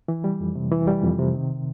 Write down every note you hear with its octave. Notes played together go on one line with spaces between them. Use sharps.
E3
G3
F2
C3
E3
G3
F2
C3
D#3